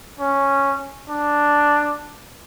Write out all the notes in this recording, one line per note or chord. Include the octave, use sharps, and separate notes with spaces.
C#4
D4